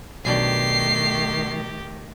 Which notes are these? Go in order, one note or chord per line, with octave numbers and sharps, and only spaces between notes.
B1 B2 D#3 A3 D4 G4 C7